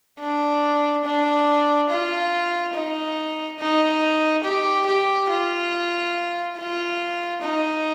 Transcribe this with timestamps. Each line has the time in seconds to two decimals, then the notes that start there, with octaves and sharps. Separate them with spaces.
0.19 D4
1.04 D4
1.89 F4
2.74 D#4
3.59 D#4
4.44 G4
4.86 G4
5.29 F4
6.57 F4
7.42 D#4